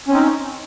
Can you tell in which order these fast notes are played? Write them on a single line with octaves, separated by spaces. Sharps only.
C#4 C4 D#4